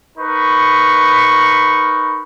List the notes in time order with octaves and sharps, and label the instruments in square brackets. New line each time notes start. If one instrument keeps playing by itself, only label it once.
[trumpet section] D#4 A#4 B4 B5 C#6